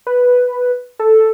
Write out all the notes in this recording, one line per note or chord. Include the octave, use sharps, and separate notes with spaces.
B4
A4